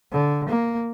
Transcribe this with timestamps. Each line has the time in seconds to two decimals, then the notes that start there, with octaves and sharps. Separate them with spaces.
0.12 D3
0.49 A#3